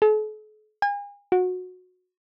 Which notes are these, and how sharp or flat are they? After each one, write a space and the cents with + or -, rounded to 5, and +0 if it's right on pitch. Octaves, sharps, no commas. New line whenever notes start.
A4 -45
G#5 -40
F#4 -20